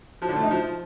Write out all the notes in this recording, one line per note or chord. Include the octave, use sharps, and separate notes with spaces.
F3
D3
A3
D#4
F3